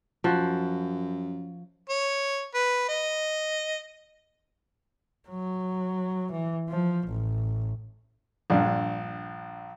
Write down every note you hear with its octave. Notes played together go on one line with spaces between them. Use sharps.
F#2 F3 F#4
C#5
B4
D#5
F#3
E3
F3
A1
A#1 G2